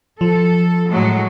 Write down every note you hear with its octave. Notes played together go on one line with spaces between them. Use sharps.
F3 A4
A2 F#3 G#3